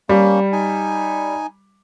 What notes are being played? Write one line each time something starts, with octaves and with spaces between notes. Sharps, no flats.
G3 A#3 C#4
D#4 G#5